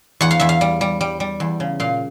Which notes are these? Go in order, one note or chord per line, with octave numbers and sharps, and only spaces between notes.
E2 F#5
F5
E2 E5
F5
G3
G3
G3
G3
E2
C#3
A#2 F5